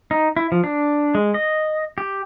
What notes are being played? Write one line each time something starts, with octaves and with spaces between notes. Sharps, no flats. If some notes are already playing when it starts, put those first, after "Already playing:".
D#4
E4
F3
D4
G#3
D#5
G4